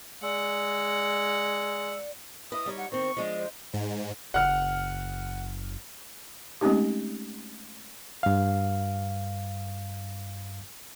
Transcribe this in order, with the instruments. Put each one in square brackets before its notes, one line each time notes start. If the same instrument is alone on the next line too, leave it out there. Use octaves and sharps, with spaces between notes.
[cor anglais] G#3 [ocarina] D5 [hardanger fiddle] F#5 [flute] E6
[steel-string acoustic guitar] E4 B4 D#5 [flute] D#6
[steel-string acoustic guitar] G3 D#4 C#5
[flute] F#5
[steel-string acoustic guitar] D#3 C4 [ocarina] C5 [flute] C#6
[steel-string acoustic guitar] F3 G#3 D4 [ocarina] D#5
[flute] C5
[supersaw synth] G#2
[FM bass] F#1 [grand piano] F#5 F6
[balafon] G#3 A3 C4 C#4 D#4 G4
[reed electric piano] G2 F5